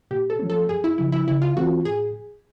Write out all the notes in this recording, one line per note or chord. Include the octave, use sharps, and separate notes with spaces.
A#2 G4
A4
F3 A3 C#4
A4
F#2 G#4
E4
C#3 F3 E4
E4
C#3 E4
F4
E3 A3 C4 F4 F#4
A2 G#4